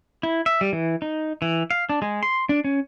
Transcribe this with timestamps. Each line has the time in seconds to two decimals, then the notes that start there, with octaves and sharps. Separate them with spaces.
0.23 E4
0.46 E5
0.61 G3
0.73 E3
1.02 D#4
1.42 E3
1.71 F5
1.89 D4
2.02 G#3
2.23 C6
2.49 D4
2.64 C#4